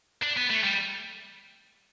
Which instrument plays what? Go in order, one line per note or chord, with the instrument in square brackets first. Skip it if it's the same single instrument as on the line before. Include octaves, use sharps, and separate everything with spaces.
[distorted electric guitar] D4
B3
A3
G3